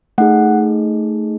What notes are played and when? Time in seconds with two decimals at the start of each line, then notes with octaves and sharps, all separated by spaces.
0.18 A3 D#4 G#4 F#5